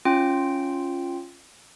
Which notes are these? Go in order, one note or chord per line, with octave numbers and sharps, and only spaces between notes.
C#4 F4 G5